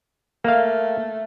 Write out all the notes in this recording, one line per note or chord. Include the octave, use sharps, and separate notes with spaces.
A3 A#3 F5